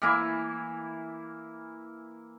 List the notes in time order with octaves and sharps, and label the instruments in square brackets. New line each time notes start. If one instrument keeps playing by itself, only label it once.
[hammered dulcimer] E3 A#3 E4